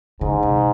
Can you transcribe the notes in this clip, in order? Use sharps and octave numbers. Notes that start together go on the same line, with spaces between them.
G#2 C#3
C3